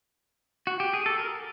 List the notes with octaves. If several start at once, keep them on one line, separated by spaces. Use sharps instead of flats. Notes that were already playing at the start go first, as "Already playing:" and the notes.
F#4
G4
G#4
A4
A#4